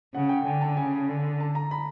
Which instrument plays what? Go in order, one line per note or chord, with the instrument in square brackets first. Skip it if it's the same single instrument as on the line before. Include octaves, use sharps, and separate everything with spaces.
[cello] C#3 [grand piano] F#5
[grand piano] G5
[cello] D3 [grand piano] G#5
[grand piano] A5
[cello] C#3 [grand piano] G#5
[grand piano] G#5
[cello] D3
[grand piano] A5
A#5
B5